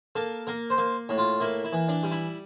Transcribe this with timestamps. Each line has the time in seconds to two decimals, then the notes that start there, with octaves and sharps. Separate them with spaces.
0.16 A#3 A4
0.47 A#3 A#4
0.70 C5
0.78 A#3
1.09 A2
1.18 F4
1.40 A#3 E4
1.64 E4
1.73 E3
1.89 D4
2.03 G3
2.11 E4